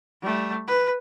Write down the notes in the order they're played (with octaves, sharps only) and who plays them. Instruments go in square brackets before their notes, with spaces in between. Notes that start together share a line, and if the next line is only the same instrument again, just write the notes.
[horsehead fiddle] G3 A3
B4